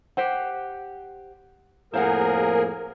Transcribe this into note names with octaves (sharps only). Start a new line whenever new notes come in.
G4 C5 F#5
F2 A2 A#3 G#4 A#4 C5 F5 F#5